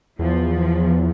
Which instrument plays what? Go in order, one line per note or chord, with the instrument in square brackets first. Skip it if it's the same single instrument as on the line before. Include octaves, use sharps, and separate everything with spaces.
[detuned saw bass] E2 [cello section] F3